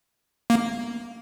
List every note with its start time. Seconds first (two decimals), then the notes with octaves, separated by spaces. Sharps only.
0.50 A#3